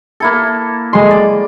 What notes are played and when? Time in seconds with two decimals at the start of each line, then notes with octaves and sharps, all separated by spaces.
0.20 A#3 E4 A4
0.93 G#3 C6
1.11 D5